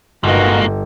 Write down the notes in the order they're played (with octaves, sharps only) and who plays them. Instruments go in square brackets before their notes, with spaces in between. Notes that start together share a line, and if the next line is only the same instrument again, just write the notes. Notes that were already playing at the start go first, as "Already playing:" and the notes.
[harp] G1 [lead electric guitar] G#2 A#3 [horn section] B2 D#3 F#4